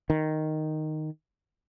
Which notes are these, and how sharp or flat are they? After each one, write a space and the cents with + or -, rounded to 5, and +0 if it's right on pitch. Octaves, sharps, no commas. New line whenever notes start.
D#3 -5